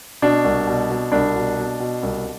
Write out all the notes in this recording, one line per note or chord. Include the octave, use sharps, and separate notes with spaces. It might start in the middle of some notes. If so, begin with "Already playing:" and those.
B2 D4
C2
B2
B2
C2 D4
B2
B2
B2
C2